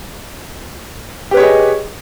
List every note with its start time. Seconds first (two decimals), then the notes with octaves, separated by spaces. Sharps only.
1.31 G4
1.34 B4
1.37 C#5
1.40 G#4
1.43 D#5